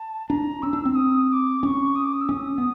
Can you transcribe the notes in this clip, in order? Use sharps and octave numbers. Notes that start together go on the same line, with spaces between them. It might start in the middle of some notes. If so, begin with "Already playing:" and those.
Already playing: A5
D4 A#5
C#4 E6
D4
C4
D#6
D#6
D6
C#4 C#6 D6
D#6
D6
D#6
E6
C#4 D#6
B3